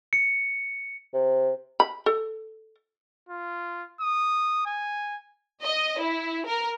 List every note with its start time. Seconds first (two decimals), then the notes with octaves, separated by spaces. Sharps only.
0.13 C#7
1.14 C3
1.80 B5
2.06 A4
3.29 F4
4.01 D#6
4.66 G#5
5.64 D#5
6.01 E4
6.46 A#4